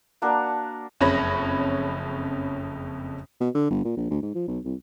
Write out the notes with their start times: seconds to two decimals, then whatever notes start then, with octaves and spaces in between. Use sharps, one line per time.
0.22 A#3 D4 F#4 A#4
1.01 F#1 F2 C#3 C#5 B5 A#6
3.41 B2
3.55 D3
3.70 G1
3.85 A#2
3.97 A#1
4.10 D2
4.22 G#2
4.35 F3
4.48 B1
4.65 C2